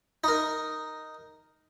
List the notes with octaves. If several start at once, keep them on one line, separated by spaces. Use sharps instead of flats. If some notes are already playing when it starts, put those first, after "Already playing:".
D#4 A#4